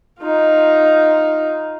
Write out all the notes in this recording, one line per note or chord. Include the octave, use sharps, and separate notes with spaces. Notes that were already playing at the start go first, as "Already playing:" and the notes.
D#4 F4